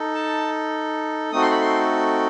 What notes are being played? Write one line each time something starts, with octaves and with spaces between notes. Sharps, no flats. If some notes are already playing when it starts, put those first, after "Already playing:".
Already playing: D#4 A4
A5
A3 C4 D#4 F#4 A4 D#6
C6
B5
C6